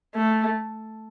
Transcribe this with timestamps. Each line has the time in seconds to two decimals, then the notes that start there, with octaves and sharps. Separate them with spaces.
0.15 A3